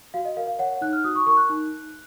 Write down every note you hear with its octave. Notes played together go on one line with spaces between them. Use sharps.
F#4 F5
D#5
A#4 F5
F5
C#5 F#5
D#4 F#6
F6
F#4 D#6
C#6
A#4 C#6
F#6
D#4